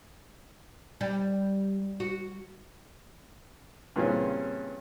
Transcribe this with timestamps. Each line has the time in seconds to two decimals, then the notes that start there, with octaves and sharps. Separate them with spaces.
1.01 G3
2.00 F#4
3.96 G2 A#2 C#3 E3 C4 C#4